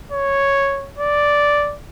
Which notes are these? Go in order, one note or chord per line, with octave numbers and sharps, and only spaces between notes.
C#5
D5